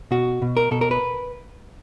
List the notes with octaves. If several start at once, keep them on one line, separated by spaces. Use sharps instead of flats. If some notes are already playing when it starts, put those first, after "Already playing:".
B2 F#4
B2
A#4
B2 A4
A#4
B4